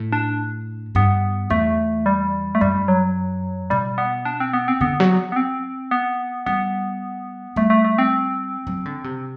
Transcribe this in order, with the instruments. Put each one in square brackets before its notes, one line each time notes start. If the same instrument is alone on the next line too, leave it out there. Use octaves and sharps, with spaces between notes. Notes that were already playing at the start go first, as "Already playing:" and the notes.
Already playing: [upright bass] A2
[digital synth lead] D4
[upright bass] G2 [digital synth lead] B3
[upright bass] E2 [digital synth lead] A3
[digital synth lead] G3
A3
[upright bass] F#2 [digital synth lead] G3
[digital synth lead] F#3
[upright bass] B2 [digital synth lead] G3
[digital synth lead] B3
D4
C4
B3
C4
[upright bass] D3 [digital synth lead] B3
[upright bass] F#3
[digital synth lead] B3
C4
B3
[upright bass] G3 [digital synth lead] B3
[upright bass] G3 [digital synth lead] A3
[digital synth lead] A3
A3
C4
[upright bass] F#3
D3
C3